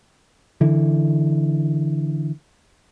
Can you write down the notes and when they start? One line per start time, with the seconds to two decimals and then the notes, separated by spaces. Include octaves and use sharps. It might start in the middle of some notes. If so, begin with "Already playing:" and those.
0.61 D3 E3